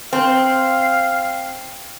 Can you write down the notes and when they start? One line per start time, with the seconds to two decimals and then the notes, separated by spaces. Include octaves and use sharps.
0.13 C4 F5